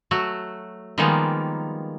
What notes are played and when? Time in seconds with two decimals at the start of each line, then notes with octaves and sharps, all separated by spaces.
0.11 F#3 A3 F#4
0.98 D#3 F3 G3 G#3 A#3 B3